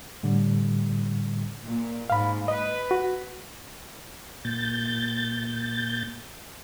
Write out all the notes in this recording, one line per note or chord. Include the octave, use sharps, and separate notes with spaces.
A2 D3 G3
A#2
G#2 F5 B5
B4 D#5
F#4
A#2 G6 A6